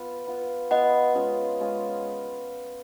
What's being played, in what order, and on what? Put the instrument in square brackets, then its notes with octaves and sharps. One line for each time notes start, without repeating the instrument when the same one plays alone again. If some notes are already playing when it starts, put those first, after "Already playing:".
Already playing: [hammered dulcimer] B3 F4 B4 F5
B3 F4 B4 F5
[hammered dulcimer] B3 F4 B4 F5 [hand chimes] D#5 F#5
[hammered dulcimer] G#3 C#4 F4 G#4
G#3 C#4 F4 G#4